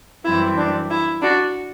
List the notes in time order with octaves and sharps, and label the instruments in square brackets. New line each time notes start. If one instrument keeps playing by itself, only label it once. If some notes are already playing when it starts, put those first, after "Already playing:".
[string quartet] F#2 E3 G3 C4 E4
D4
E4
D4 F#4